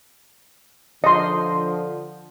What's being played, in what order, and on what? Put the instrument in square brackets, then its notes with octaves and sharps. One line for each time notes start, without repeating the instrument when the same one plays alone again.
[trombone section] D3 F3 [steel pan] D#5 C6